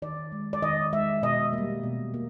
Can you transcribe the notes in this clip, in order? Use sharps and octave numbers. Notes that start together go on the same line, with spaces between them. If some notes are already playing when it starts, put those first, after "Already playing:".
D#3 D5
G#3
D5
D#3 D#5
G#3 E5
B2 D#5
G3 A#3
B2
A#3